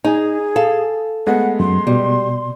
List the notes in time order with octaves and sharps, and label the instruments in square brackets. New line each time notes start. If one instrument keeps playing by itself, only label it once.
[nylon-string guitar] D#4 [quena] G#4 [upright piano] G#5
[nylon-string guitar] A4 F5
[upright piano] G#3 A3 B3 [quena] F#5
[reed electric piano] F#2 [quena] C6
[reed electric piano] B2 [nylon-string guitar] G3